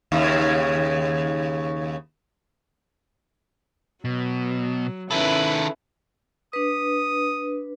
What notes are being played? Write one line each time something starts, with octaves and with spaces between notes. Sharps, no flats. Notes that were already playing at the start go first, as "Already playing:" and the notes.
D#2 C#3
B2 F#3
D#3 C#4 E4 A4 B4 B5
D4 B4 D#6